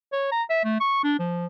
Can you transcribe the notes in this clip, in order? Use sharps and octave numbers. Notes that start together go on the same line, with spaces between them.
C#5
A#5
E5
A3
C#6
D4
F3